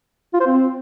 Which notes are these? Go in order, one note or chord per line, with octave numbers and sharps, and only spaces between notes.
F4
C5
C4